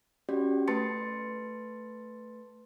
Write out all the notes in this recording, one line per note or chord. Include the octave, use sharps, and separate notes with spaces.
C#4 F#4 G4 D5
A3 B4 A5 C6 A6 C#7